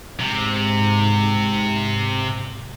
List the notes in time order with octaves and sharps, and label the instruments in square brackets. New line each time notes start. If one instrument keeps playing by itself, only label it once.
[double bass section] G#2 [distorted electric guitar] C3